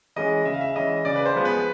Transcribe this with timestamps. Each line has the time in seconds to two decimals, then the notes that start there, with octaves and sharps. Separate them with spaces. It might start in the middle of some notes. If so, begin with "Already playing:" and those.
0.16 E3 G#3 C#4 D#5
0.45 C#3 E5
0.53 F5
0.61 E5
0.76 E3 G#3 C#4 D#5
1.05 C#3 D5
1.16 B4
1.25 C5
1.36 F3 G#3 B3
1.45 B4